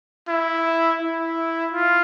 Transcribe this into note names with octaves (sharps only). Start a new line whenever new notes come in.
E4
E4
F4